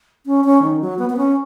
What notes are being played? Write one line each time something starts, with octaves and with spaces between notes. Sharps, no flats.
C#4
C#4
D#3
F#3
B3
B3
C#4